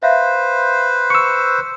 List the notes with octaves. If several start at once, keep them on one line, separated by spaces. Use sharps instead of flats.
B4 C5 E5 F5
C#6 E6 C#7